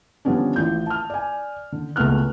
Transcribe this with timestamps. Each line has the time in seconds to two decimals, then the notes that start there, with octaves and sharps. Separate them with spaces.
0.25 D3 F3 G3 B3 C#4 D4
0.56 A1 F4 G6
0.86 A5 F6
1.10 D5 G#5
1.72 D3
1.96 C#2 A3 B3 F6 F#6